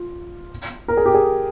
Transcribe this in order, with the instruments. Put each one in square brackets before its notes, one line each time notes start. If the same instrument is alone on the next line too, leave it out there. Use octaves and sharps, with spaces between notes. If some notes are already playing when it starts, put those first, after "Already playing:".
Already playing: [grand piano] F4
A#4
G#4
G4
G#4